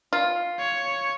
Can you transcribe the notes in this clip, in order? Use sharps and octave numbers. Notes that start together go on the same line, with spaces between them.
F4
C#5